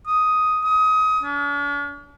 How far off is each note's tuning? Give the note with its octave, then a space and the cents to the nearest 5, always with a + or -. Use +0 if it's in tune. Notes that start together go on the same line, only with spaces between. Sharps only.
D#6 +5
D#6 +25
D4 -45